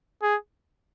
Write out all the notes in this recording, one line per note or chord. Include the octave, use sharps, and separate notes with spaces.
G#4